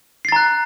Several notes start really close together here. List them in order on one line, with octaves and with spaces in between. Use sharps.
C7 A6 A#5 F#6